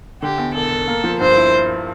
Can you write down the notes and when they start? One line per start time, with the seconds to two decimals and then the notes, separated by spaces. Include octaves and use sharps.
0.22 D3 G4
0.38 E2
0.55 E1 A4
0.71 E1
0.88 A#3
1.04 F3
1.20 G2 C5
1.36 E4